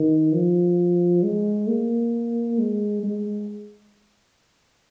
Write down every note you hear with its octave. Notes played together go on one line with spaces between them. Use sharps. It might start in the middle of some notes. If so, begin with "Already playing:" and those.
Already playing: D#3
F3
G#3
A#3
G#3
G#3